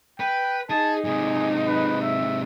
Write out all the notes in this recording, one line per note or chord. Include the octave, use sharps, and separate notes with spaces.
B4 G5
D#4 G#4 A5
G#2 C3 G#4
B4
E5